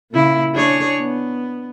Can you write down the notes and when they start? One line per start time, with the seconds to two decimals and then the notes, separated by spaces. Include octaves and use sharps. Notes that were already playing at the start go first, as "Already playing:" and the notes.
0.12 A#2 C#3 E4
0.54 D4 G#4 C#5
1.00 B3